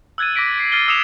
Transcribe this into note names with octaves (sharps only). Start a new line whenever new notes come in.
E6 F#6 G#6 A6 D#7
D6 A#6 B6 D7
C7
F6 A6 C7 D#7 G7
D#6 E6 C#7 E7 F7